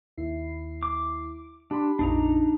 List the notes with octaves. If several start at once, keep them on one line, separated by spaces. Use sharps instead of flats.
D#2 E4 C7
D6
D4 G4 B5 C6
A#1 F2 D4 D#4 A#5